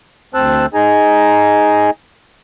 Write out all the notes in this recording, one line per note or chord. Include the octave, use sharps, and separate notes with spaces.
D2 C4 C5 A5 E6 F#6
D#4 G#4 G#5 A#5